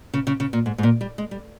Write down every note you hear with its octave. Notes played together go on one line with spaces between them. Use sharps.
C#3
C#3
C#3
A#2
G#2
G#2
A#2
G3
G#3
G3